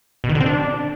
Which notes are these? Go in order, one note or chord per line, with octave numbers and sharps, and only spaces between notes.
B2
D#3
D3
C4
D4